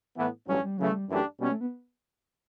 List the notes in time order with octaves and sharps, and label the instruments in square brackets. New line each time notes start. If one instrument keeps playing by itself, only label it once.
[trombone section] A2 E3 B3
[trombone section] A1 G2 F#3 C#4 [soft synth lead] G3
[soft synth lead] G3
[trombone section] C#3 E3 A3 [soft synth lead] F#3
[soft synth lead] G3
[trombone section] F#2 E3 A3 D4 G4
[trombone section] B2 G3 C#4 [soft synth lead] B3
[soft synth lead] A3
B3